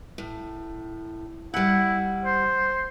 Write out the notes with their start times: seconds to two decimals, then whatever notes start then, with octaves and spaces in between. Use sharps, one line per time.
0.18 A2
1.54 G3 E4 F#5
2.25 C5